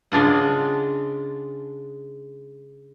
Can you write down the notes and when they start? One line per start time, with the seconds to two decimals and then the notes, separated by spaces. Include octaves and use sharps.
0.12 C#3 G#3 D4 F4 F#5